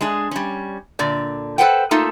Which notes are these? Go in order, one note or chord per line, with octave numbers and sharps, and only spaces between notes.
G#3 D4 G#4
G3 C#4
A#2 D3 D5
A4 B4 C5 F#5 G5
A3 A#3 D#4 F4 A4